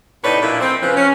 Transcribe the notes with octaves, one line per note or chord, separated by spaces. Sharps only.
A2 C3 D#4 B4 C#5 D5
A#2 F3 D4 E4
C4
C#3 F3 B4
C#4